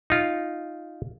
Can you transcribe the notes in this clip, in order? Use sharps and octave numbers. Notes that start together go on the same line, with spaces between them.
D#4 F4